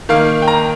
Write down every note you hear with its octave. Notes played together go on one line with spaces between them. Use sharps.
D#3 A#3 F5
G5
A#5